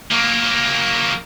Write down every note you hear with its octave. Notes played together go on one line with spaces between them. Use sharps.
F#3 A#3